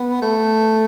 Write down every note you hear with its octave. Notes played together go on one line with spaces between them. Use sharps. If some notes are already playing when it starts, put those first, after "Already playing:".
Already playing: B3
A3